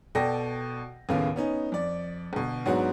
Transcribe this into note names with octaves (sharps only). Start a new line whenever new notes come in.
B2 A4 D5 G5 A#6
D#2 A2 C#3 B3 F5
B3 C#4 D#4
F2 D5
G1 B2
G#2 F#3 B3 D4 F#4